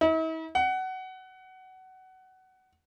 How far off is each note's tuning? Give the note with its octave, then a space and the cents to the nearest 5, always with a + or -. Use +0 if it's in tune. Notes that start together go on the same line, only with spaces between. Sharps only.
E4 -45
F#5 +20